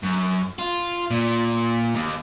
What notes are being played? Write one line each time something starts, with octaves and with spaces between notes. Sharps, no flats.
F#2
F4
A#2
D#2